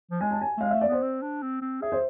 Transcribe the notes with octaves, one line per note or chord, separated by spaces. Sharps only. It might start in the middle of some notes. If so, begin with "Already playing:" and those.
F3
G#3 G#5
A5
G#5
A3
G#3 F5
A3 E5
D5
B3 C5
C4
D4
C4
C4
G#4 E5
C5